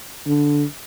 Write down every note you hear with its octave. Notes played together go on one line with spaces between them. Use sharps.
D3